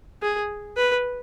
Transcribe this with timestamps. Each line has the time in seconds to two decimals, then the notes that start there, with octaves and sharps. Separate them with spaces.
0.22 G#4
0.77 B4